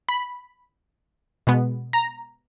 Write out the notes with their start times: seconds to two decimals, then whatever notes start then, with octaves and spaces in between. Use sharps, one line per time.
0.09 B5
1.47 B2 G#3 B3
1.93 A#5